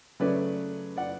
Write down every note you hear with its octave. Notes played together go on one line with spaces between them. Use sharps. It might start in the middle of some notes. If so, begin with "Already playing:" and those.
C#3 F#3 A3 C#4 B4 D5
D5 F#5